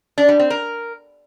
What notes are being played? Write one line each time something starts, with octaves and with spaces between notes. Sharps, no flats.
D4
G3
C4
A#4